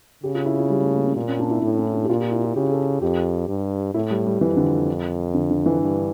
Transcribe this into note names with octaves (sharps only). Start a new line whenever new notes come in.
C#3 G4
F4
E4
F4
G3
A3
A#3
C#4
A#2 A#3
C#4
D4
E4
A2 D4
C#4
D4
G4
A#2 F4
G4
E4
F4
C#3 G4
A4
F2 G4
G2
A2 E4
G3
G3
F2 E3
D3
D3
D3
E3
G2